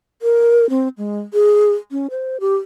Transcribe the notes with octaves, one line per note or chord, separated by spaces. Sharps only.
A#4
C4
G#3
G#4
C#4
C5
G4